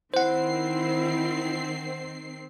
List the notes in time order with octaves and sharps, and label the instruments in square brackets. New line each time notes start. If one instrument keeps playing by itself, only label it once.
[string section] D#3 C4 C7 [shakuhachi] E4 [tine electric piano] C5 F#5